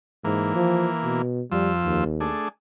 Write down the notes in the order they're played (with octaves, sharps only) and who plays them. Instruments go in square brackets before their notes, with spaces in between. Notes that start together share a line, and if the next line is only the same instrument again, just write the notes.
[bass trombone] G#2 [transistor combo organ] E3 A#3
[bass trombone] F3
B2
[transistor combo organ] F2 F3 E6 [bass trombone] G3
[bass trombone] D#2
[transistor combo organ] A3 D4 G#4